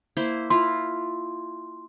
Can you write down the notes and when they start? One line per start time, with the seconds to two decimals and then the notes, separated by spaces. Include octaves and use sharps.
0.17 A#3 E4 C5
0.50 E4 F4 C6